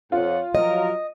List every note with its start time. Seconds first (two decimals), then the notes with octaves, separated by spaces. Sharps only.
0.12 F2 F4 C#5 F#5
0.55 F3 F#3 A#4 D#5